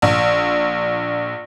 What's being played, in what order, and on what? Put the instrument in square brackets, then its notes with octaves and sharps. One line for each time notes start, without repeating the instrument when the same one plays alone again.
[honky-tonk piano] A#1